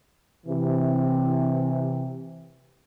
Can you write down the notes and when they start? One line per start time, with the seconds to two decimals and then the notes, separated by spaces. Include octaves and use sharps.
0.46 C3 E3